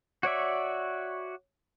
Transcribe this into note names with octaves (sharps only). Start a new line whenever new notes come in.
F#4 C#5 D5 E5